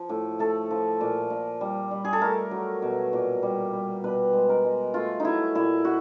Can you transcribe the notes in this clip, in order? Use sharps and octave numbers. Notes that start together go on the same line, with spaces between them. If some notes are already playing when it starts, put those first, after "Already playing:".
Already playing: F3
A2
A3 A4
F3
A#2
A#2
G3
G3
G#4
A4
A3 A#4
F#3
B2
A#2
G3
G3
B2 B4
G#3
A#4
G#3
A3 F4
F#3 D#4 E4
A#2 E4
F#4